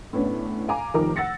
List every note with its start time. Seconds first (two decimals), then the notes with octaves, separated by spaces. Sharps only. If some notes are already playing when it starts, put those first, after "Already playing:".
0.13 A2 B3 C#4 D4
0.68 F5 G#5 A#5 D6
0.94 F1 D#3 F3 A#4 D6
1.16 F#5 E6 A6 A#6 C#7